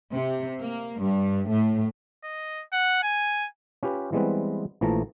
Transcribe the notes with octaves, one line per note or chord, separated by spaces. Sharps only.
C3
A#3
G2
A2
D#5
F#5
G#5
C#4 F4 G4 B4
E3 G3 G#3 B3 C4 B4
A#1 E3 F3 A3 A5 A#5